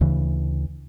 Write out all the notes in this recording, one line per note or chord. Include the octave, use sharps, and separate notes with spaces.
D2 C#3 E3